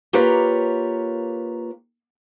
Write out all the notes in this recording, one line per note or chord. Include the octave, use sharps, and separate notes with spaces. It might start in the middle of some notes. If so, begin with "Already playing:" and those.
A#3 F4 G4 A#4 B4 C#5